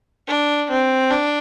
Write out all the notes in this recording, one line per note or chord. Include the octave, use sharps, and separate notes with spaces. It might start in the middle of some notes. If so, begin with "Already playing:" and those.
D4
C4
D4